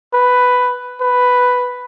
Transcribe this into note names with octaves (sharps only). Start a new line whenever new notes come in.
B4
B4